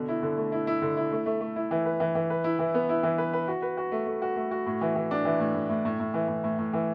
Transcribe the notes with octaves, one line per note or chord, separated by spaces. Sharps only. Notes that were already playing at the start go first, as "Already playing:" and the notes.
Already playing: B2 D3
E4
D3
A3
E4
E4
D3
E4
A3
A3
A3
E4
E3
B4
E3
E3
B4
E4
E3
B3
E4
E3
B4
B4
F#4
B4
F#4
A3
A3
F#4
A3
F#4
A2
E3
E3
D4
E3
A2
A2
A2
A2
A2
E3
A2
A2
A2
E3